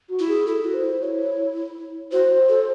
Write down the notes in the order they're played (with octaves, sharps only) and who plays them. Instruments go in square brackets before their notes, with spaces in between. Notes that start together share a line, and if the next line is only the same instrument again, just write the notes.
[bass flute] F#4
[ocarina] E4
[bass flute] G#4
[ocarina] E4 [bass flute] A4
[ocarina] F#4
[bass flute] C5
[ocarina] E4
[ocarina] E4 [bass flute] C#5
[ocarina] F#4 [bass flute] C5
[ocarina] A4